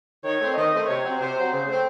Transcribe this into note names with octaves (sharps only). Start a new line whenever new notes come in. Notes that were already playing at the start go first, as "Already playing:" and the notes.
D#3 C#5
A3 C4
D#3 D#5
A3 C4
C3 C#5
F#3 C4
C3 C5
F#3 C4
C#3 C5
A3 C4